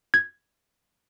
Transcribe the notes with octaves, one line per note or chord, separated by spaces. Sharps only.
G#6